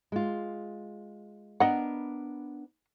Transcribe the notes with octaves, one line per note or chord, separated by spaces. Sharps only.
G#3 F4
B3 D4 A#4 D#5 F#5